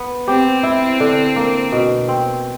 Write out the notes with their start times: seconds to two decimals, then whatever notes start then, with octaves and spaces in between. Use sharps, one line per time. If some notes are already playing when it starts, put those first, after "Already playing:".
Already playing: B3
0.28 C4 G4
0.63 E4
1.00 D3
1.36 A#3
1.72 B2
2.08 C4